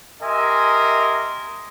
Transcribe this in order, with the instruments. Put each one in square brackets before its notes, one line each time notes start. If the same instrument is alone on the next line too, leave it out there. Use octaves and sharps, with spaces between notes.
[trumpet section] G4 A#4 D#5 E5 G#5 C6